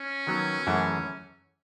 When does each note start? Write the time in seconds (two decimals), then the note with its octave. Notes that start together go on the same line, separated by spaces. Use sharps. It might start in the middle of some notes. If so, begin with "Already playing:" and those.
Already playing: C#4
0.27 D#3 F#3 B3
0.67 F#2 E3 A3 E4 G#4